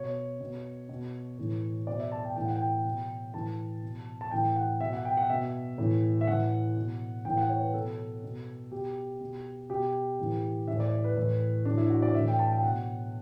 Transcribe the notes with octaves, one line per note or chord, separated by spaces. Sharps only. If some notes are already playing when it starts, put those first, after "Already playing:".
Already playing: B2 C#5
B2
B2
A2 E3
B2 D5
E5
A5
G5
A2 E3 G5
F#5
G5
B2
A2 E3 A5
B2
A5
A2 E3 G5
F#5
B2 E5
F#5
G5
F#5
B2 E5
A2 E3
E5
A2 E3 F#5
B2
A2 E3 G5
F#5
C#5
B4
B2 A4
B2
B2 G4
B2
B2 G4
A2 E3
A2 E3 E5
D5
B4
A2 E3
A2 E3 D4
E4
F#4
D5
A2 E3 E5
G5
A5
G5
B2 F#5